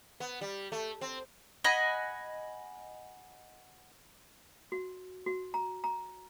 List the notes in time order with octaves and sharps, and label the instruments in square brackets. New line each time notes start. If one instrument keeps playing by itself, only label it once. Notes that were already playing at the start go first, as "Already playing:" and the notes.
[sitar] B3
G3
A3
C4
[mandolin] D#5 F#5 G#5 B5
[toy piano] F#4
F#4
A#5
A#5